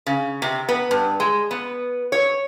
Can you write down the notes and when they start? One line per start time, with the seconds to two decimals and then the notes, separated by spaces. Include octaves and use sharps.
0.06 C#3
0.42 C3
0.69 B3
0.91 G2
1.20 G#3
1.51 B3
2.12 C#5